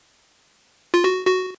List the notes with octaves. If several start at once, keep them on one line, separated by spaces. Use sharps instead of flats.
F4
F#4
F#4